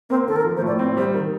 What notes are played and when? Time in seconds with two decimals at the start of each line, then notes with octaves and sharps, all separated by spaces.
0.10 A#3 C4
0.28 D#3 A4
0.36 A#4
0.45 F3
0.57 C5
0.62 A2
0.67 D5
0.79 C4 C5
0.97 G3 C5
1.14 D#3 A#4